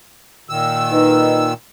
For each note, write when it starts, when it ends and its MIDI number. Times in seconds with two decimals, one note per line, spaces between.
0.50 1.53 46
0.50 1.53 51
0.50 1.53 88
0.92 1.46 63
0.92 1.46 71